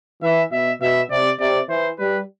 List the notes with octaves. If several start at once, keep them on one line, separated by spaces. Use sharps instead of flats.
E3 E5
B2 E5
B2 E5
C3 D5
C3 D5
E3 C5
G3 B4